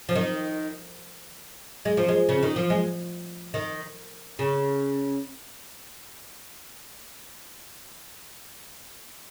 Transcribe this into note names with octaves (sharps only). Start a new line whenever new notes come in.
F3
D#3
G#3
F3
G#3
C#3
D#3
F3
G#3
D#3
C#3